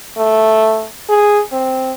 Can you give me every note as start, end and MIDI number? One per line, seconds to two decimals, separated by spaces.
0.18 0.85 57
1.09 1.40 68
1.52 1.92 60